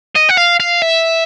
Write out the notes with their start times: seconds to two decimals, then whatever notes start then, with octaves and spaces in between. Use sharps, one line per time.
0.16 D#5
0.29 F#5
0.38 F5
0.60 F5
0.82 E5